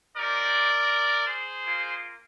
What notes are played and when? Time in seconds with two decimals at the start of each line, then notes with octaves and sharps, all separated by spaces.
0.17 C4 D#4 G4 A#4 D5
1.26 G#4 C5
1.63 A#3 F4